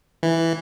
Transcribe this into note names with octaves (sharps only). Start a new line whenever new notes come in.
E3